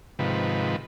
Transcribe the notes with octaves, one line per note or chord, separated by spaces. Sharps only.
G#2 C3 D#3 F3 B4